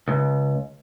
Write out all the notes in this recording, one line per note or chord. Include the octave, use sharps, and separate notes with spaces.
C#2